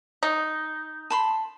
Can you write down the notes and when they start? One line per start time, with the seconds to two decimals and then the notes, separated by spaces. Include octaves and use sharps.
0.23 D#4
1.10 A5 B5 C6